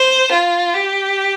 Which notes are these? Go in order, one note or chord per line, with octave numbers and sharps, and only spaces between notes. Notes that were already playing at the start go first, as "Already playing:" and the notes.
Already playing: C5
F4
G4